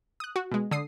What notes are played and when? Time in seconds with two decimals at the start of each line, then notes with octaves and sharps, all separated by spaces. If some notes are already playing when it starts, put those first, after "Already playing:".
0.20 D#6 F#6
0.36 F#4
0.51 B2 G#3
0.71 D3 D#6 C7